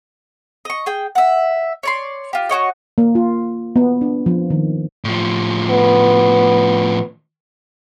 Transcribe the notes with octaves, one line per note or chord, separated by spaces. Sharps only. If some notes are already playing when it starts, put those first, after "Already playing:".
D#5 C#6
G#4 G5
E5 F#5
C#5 D5 C6
F4 G4
F#4 G4 C#5 D#5
A#3
F4
B3
D4
F3
D#3
A2 F3
B3